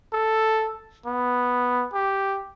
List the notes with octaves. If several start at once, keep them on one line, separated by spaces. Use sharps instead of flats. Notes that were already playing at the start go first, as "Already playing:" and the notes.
A4
B3
G4